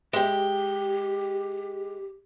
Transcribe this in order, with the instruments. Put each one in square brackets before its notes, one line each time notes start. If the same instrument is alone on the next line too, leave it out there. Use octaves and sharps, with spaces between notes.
[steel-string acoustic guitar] G#3 G5 [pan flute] G4